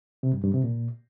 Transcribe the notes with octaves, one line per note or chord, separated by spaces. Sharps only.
C3
G2
G2
C3
A#2